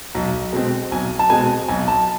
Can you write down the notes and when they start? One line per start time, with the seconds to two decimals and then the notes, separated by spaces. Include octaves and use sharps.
0.15 B1
0.53 B2 G#3 C4
0.91 B1 G#5
1.19 A5
1.30 B2 G#3 C4 G#5
1.68 B1 G#5
1.88 A5